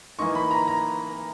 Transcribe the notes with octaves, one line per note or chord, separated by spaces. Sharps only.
E3 A#3 D#4 C#6
B5
A#5
A#5